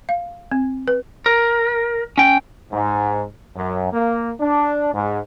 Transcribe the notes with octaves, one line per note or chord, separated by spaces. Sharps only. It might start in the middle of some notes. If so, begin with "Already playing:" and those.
F5
C4
B4
A#4
C#4 G5
G#2
F#2
A#3
D4
G#2